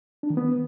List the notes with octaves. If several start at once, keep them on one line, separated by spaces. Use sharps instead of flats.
D4
D#3
B3